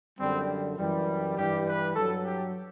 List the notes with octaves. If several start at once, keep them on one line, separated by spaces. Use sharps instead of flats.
F#2 D3 G3 C4
F#2 E3 G3
G2 E3 G3 G4
B4
G2 F#3 A4
G4